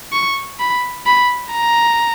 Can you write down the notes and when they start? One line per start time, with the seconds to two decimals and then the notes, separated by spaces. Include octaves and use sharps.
0.13 C#6
0.60 B5
1.06 B5
1.52 A#5